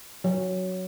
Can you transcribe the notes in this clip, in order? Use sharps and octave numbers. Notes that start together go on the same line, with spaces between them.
F#3